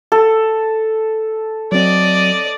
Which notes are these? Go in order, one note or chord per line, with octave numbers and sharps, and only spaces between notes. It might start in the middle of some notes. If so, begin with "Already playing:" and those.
A4
F#3 C4 D5 D#5